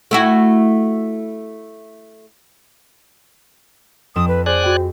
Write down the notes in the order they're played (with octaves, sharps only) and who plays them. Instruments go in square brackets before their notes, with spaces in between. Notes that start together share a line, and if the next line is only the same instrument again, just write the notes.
[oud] A3 E4 F#4
[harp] F2 C4 E7 [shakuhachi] D#6
[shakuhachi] B4
[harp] G#4 [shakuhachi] C5 [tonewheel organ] D5 G#5 F#6
[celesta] F#4 G5